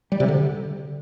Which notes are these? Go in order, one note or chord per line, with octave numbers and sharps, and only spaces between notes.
G3
C3
D3